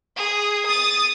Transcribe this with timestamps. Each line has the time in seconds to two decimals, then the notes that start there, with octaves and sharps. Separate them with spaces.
0.17 G#4
0.67 D#6 A6